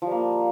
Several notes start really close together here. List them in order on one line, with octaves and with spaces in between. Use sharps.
F3 G3 A#3